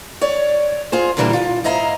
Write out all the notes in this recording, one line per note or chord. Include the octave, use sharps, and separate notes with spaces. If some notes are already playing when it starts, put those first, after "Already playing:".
C#5 D5
F4 G#4 C5
A#2 D3 E3 G3 G#3 A#3
F4
G#2 E4 D#5 F5 A#5